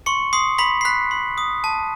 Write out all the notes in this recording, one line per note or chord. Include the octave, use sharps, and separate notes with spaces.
C6 C#6 C#7
C6 D#6 C7
B5 C6 B6
C7
B5 F#6 B6
C6
D#6
A5